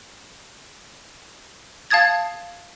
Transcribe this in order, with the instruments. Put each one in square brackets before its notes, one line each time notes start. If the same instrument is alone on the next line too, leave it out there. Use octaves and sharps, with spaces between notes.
[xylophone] F5 A5 D#6 G#6 A6